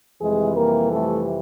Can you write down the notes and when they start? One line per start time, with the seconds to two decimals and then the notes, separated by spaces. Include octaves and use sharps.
0.22 F2 C3 E3 G3 G#3 G#4
0.56 A#3 A#4
0.91 A3 A4